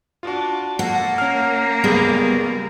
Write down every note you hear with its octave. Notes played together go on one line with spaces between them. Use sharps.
D4 F4 F#4
A#3 A4 F#5
C#4 A#4 F6
G1 C#2 G3 B3 G#4